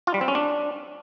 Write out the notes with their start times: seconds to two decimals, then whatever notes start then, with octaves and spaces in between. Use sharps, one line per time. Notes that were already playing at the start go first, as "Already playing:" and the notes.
0.07 F4
0.14 G3
0.21 C4
0.28 C#4
0.35 D4